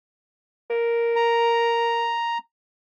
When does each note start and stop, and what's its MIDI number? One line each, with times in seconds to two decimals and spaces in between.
0.70 2.14 70
1.16 2.38 82